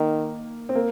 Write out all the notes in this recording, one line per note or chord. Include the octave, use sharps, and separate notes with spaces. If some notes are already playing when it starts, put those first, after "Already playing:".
Already playing: D#3 A#3
C4
A#3